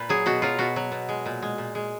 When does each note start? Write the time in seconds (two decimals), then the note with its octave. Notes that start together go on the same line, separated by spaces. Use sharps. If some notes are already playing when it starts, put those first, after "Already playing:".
Already playing: A#2 B4
0.09 F#3 G#4
0.26 B2 F#4
0.42 F#3 F4
0.58 B2 F#4
0.76 F#3
0.92 B2
1.09 G#3
1.26 A#2
1.42 G#3
1.58 A#2
1.75 G#3